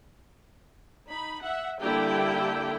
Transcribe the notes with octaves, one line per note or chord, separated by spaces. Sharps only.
D#4 B5
E5 F#5
D3 G3 A#3 E4 G4 G5